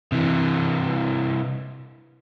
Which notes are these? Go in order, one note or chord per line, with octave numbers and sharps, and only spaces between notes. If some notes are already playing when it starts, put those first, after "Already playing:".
C3 E3